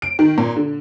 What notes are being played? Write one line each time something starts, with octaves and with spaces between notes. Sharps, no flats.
D7
D#3
A#2
D3